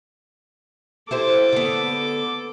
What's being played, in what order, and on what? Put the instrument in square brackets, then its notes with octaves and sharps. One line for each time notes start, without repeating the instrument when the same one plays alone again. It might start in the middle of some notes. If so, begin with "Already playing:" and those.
[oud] E4 G4 C5 [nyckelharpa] A4 D6
[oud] D3 B3